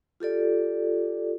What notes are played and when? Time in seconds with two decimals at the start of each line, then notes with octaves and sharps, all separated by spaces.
0.20 F4 G4 A4 D5